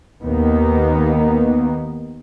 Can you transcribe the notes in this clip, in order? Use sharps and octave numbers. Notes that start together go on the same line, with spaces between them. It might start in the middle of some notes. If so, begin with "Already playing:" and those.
D#2 D#3 A#3 B3